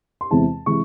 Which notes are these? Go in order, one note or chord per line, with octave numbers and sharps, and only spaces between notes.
C6
E2 C3 E3 G#3 A5
C3 E3 G#3 C#6